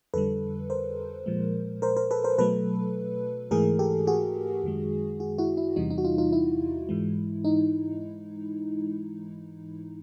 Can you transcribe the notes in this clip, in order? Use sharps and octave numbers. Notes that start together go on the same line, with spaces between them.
F2 D3 G3 A4 B4
A#4 C5
A#2 F3 G#3
A#4 C5
A#4 C5
A4 B4
A#4 C5
B2 F#3 A3 A4 B4
G#2 E3 A3 G#4 A#4
G4 A4
F#4 G#4
F#2 D#3 G#3
F#4 G#4
E4 F#4
E4
E2 C3 E3 G3 D#4
D#4
F#4
D#4 F4
D#4 F4
E4
G#2 E3 G#3
D#4